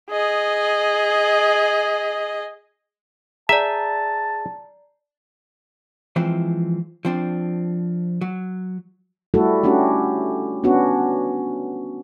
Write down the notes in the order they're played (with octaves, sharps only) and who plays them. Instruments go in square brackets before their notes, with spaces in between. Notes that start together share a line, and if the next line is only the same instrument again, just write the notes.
[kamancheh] G#4 D#5
[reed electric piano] G#4 [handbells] D5 A#5 [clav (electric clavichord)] E5 [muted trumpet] A5
[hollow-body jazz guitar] E3 F3 G#3 C4 E4
F3 C4 D4
F#3
[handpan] G3 A3 E4 F#4 A4
A3 C#4 D4 F#4 G4
B3 C#4 D4 F#4